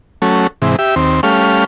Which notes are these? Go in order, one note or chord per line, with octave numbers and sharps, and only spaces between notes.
F#3 A3 C#4
G#2 C3 E3
G4 E5
D#2 C4
G3 A3 C#4 F5